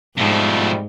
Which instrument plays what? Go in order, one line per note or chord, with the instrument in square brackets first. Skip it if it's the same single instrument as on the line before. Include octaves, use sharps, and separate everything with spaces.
[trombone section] F2 G3 A3 [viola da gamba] G#2 [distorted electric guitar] B2 F3